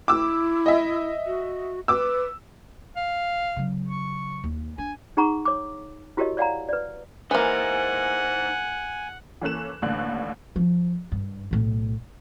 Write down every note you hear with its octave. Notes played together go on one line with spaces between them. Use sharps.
E4 D6 E6
D#5 E5
F#4
B4 D6 E6
F5
C#3 F#3
C#6
D#2
D4 G#5
D#4 G#4 F#5 A#5 C#6
C#5 D6
E4 F#4 G4 A#4 C#5 D#5
C#5 D5 F5 F#5 G#5 A#5
B4 D5
E3 A#3 D#4 C5 F#5 G#5
E3 A#3 C#4 A4 F#6 E7
A1 D#2 A2 D3 F#6
F3
G2
B1 A2